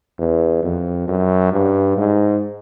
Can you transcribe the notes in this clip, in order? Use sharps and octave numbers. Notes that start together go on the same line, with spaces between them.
E2
F2
F#2
G2
G#2